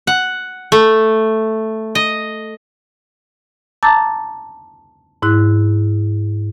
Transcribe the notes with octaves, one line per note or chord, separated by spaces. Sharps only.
F#5
A3
D#5
A5 A#5 D6 E6 G6 A6
G#2 E4 F#6